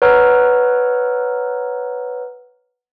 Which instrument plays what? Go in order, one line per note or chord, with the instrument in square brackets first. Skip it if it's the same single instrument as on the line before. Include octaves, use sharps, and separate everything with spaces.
[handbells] B4 C#5 F#5 A#5 E6 F6